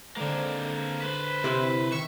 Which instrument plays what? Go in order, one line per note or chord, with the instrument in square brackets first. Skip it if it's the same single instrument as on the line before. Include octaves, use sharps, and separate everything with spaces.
[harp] D3 G#3 [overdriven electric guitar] A#3 C4
[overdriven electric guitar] B4 C5
[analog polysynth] C3 C4 E4
[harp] D#3 C4 [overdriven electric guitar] E5 [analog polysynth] C#6